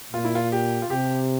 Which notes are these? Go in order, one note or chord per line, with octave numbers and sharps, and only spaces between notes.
A#2 F4
E4
F4
G4
F4
C3 G4